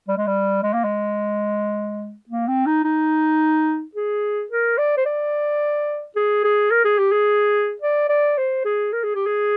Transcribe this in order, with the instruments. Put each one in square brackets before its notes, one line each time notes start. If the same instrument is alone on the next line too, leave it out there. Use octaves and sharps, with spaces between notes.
[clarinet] G3
G#3
G3
G#3
A#3
G#3
A#3
C4
D#4
D#4
G#4
A#4
D5
C5
D5
G#4
G#4
A#4
G#4
G4
G#4
D5
D5
C5
G#4
A#4
G#4
G4
G#4